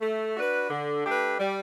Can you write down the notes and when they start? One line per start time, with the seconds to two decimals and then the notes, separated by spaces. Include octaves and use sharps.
0.01 A3
0.36 D4 F#4 B4
0.70 D3
1.04 A3 D4 G4 B4
1.38 G3